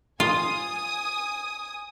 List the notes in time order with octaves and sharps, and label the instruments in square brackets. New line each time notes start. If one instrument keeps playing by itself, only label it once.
[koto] F4 [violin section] G#5 D#6